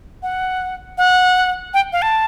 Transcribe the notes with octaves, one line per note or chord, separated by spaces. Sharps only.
F#5
F#5
G5
F5
A5